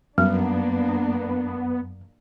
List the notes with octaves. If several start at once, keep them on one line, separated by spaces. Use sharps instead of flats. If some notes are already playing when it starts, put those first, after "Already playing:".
F#2 G3 A#3 B3 D4